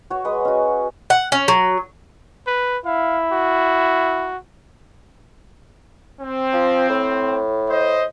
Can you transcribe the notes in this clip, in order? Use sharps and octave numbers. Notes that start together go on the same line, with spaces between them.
F#4 C#5
G#3 B4 D#6
C#4 F#4
F#5
C#4
F#3
B4
E4 F5
F#4
C4
F3
A2
C5 D#5